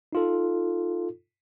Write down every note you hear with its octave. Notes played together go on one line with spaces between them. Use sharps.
D#4 F4 A4